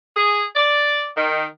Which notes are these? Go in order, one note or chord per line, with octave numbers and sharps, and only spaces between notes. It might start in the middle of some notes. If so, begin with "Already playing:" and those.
G#4
D5
D#3